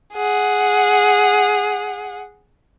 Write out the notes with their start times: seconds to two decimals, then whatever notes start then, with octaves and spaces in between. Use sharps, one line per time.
0.14 G#4 F#5